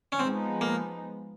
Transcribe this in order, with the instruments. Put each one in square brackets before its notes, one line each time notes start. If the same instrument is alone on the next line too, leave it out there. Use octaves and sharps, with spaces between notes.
[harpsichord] C#4
[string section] F3 G#3 B3 D#4 [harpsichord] C4
[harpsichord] A#3